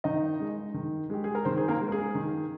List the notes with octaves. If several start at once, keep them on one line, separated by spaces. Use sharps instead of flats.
D#3 D#4 D#5
G#3
D#3
G#3 G4
G#4
A#4
D#3 C4 C5
G#4
A#3 A#4
G#3
A#4
G#4
D#3